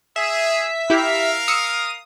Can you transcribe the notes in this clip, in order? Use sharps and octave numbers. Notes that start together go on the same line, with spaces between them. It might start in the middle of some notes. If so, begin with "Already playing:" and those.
G#4 E5
E4 G4 A#4 F5
D#6 E6 C#7